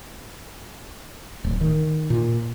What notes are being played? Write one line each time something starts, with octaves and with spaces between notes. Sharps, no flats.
D1
D#3
A#2